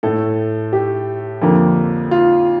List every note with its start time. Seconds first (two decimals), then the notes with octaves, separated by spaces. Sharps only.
0.03 A2 A3 A4
0.73 G4
1.42 F2 D3 F3 A#3
2.11 F4